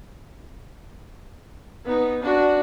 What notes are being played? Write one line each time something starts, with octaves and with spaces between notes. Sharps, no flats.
B3 D#4
D4 F#4